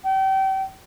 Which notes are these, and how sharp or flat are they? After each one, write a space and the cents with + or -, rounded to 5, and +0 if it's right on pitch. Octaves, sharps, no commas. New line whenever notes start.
G5 -35